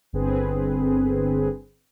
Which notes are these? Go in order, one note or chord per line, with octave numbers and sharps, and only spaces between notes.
G1 D3 C4 G#4 B4